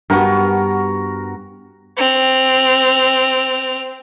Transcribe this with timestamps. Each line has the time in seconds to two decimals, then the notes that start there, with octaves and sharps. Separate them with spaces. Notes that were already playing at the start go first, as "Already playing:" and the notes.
0.10 G2 B3 F#4 A#4
1.97 C4 F7